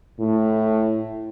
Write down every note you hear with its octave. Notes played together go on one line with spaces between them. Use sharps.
A2